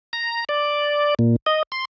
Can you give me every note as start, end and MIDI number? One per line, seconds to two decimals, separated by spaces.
0.13 0.44 82
0.49 1.14 74
1.19 1.36 46
1.46 1.63 75
1.72 1.85 84